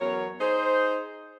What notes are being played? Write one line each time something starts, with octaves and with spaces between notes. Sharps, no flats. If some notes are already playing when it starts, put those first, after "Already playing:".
E2 F#3 A#4 C#5
D#4 G#4 C5